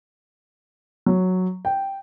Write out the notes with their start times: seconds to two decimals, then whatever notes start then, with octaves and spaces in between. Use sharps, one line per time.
1.06 F#3
1.65 G5